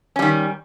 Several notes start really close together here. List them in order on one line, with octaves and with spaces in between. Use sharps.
C#4 G3 D#3